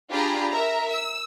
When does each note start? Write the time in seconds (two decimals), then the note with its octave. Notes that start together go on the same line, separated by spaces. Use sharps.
0.11 D4 F4 G4 G#4 A#5 B5
0.52 A#4 E5 A#5
0.91 E6